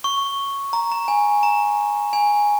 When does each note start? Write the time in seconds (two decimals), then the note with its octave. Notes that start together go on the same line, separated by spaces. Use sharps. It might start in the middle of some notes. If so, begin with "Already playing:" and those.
0.04 C#6
0.73 A#5
0.92 A#5
1.08 G#5
1.43 A#5
2.13 G#5